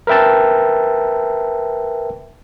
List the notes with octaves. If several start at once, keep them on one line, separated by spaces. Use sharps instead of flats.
A#4 B4 E5 G5 A5